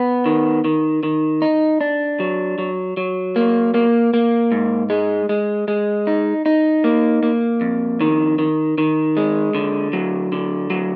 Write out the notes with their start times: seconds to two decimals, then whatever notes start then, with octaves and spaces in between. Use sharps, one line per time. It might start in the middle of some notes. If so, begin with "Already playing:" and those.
Already playing: B3
0.26 D#3
0.64 D#3
1.03 D#3
1.42 D#4
1.81 D4
2.20 F#3
2.58 F#3
2.97 F#3
3.36 A#3
3.74 A#3
4.14 A#3
4.52 G#2
4.90 G#3
5.29 G#3
5.68 G#3
6.07 D#4
6.46 D#4
6.84 A#3
7.23 A#3
7.61 F2
8.01 D#3
8.39 D#3
8.78 D#3
9.17 G#3
9.55 D3
9.93 F#3
10.32 D3
10.70 F#3